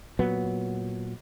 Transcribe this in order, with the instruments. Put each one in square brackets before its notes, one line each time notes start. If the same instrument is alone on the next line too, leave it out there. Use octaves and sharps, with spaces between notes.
[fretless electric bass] A#2 F#3 B3